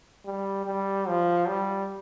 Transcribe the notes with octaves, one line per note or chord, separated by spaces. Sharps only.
G3
G3
F3
G3